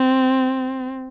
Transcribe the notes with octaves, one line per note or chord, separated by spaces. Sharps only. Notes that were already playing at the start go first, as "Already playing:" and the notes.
Already playing: C4